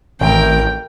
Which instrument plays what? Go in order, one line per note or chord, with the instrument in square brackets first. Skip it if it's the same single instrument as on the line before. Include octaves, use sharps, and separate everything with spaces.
[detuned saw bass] A1 [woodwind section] D#3 A3 C4 [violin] A#4 G5